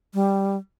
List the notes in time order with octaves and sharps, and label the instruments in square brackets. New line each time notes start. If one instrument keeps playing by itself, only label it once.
[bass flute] G3